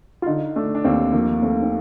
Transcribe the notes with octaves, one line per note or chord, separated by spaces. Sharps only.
F4
D3 D#4
A3 D4
D4
D#2 C4
F3 A#3
A3 C4
C4